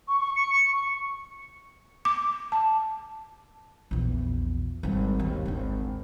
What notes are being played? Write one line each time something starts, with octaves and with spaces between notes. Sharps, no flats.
C#6
C#6
C#7
C#6
D6
A5
A#1 E2
G#1 G2
D#2
G#1 D3